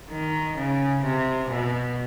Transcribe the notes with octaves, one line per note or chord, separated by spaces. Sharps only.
D#3
C#3
C3
B2